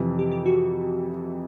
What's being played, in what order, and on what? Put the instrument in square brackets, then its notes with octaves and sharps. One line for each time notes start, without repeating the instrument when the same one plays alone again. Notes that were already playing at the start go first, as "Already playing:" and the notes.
Already playing: [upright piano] F2 C3 E3
[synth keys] G4
G4
F#4